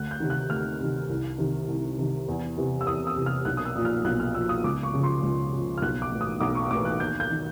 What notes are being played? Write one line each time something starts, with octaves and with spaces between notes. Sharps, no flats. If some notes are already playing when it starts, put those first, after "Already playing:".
Already playing: D2 F#6
G6
C3 D#3
F#6
D2 F6
C3 D#3
C2
C3 D#3
C2
C3 D#3
E2
C3 E3
E6
E2 D#6
E6
C3 E3
F6
B1 F#6
D#6
E6
A#2 F3
F6
B1 F#6
F6
A#2 F3 E6
D#6
C#2 D6
C#6
C#3 F3
C6
C#2
C#3 F3
F6
B1 F#6
D6
A2 E3
D#6
B1 D6
C#6
A2 E3 D6
F#6
D#2 G6
G6
D#3